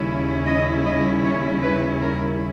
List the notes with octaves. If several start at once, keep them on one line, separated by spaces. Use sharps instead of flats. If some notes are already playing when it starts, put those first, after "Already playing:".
Already playing: D#2 C#3 G3 C#4 E4
D#5
D#5
C#5
B4
A#4